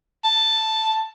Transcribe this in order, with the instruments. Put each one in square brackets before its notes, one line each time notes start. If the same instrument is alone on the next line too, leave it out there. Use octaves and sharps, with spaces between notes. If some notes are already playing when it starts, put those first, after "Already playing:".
[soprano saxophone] A5